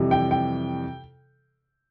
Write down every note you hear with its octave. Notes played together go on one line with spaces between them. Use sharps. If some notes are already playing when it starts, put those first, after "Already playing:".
Already playing: F2 C3 E3 G3
G5
G5